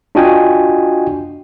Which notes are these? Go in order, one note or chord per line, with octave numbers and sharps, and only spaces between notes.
D4 F4 F#4 D#5 G5 G#5